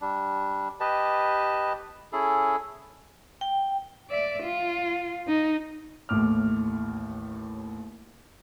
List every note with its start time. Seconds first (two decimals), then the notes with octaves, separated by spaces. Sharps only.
0.01 G3 D4
0.80 G4 B4 D#5 A5
2.13 C#4 E4 G#4 A4
3.41 G5
4.10 D5 E5
4.44 F4
5.28 D#4
6.09 A1 D#2 A2 D6 F6